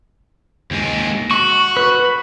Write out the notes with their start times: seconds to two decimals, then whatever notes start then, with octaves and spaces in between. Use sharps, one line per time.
0.71 D#2 G#3
1.31 F#4 C#6
1.77 B4